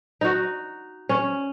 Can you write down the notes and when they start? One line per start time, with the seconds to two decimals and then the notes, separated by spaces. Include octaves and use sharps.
0.21 D#4 F#4
1.09 C#4